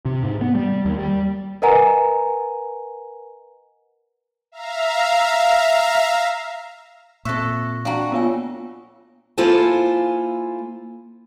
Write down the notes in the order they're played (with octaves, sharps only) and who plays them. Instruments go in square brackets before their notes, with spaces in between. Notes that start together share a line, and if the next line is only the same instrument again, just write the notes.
[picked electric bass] C3
G#2
B3
G3
D#2
G3
[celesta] A#4 B4 D#5 F#5 G#5 A#5
[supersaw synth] E5 F5 A#5
[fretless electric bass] A#2 C4 [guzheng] A4 E5 [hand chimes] C#6 F#6 A#6
[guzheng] D4 F#4 [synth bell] F5 G5 A#5
[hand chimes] A#3 C#5 [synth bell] B3 F4 G#5
[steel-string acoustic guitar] A#3 E4 F4 A4 C5 G#5